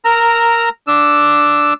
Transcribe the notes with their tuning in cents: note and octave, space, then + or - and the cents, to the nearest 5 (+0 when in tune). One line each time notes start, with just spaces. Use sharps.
A#4 +0 A#5 -10 E6 +0
D4 +0 E6 +0